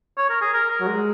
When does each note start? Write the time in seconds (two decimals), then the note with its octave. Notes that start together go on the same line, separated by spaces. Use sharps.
0.18 C#5
0.30 A#4
0.42 G#4
0.53 A#4
0.71 A#4
0.80 F#3
0.87 G#3